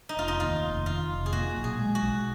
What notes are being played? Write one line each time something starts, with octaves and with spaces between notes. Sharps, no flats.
D#4
F1 F4
D#4
D#2 F4
F1
D#3 F4
F1
G#4
A#2 F#4
B1
G#4
G#3
F#4
B1